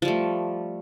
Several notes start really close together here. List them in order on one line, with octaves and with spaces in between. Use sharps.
F3 G3 A3